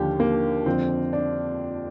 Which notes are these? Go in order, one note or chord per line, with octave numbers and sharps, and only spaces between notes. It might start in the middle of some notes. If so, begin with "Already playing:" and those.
Already playing: D#2 D3 F3 G4
A#3
F2 D3 F3 C4
D4